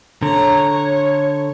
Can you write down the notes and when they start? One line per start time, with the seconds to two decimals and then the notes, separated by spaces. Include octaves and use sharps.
0.23 D3 C#5 A#5
0.70 C#5